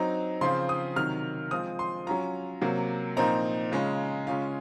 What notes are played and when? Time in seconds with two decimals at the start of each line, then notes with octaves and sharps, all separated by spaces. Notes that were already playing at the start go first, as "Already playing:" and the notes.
Already playing: F#3 C4 D#4 A#5
0.41 C#3 F3 C4 F4 C6
0.69 D#6
0.96 C3 D#3 F#3 F6
1.51 F3 G#3 C4 F4 D#6
1.79 C6
2.06 F#3 C#4 F4 A#5
2.61 C3 F#3 A#3
3.17 A#2 F3 C4 D#4 A#5
3.71 C#3 G#3 C#4 F4
4.27 C#3 G#3 C#4 F4 F5